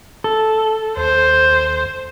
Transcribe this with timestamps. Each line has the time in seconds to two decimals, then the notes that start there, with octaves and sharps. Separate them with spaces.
0.24 A4
0.97 D#2 C5